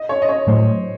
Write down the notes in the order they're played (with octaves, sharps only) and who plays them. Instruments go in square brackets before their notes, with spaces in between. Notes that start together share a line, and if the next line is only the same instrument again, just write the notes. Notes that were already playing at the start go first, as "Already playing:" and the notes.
Already playing: [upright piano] D#5
C#5
D#5
C#5
[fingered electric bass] A2 F#3 A3 [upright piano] C5